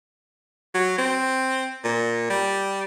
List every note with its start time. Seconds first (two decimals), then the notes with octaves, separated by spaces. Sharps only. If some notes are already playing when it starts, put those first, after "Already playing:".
0.75 F#3
0.98 C4
1.84 A#2
2.30 G3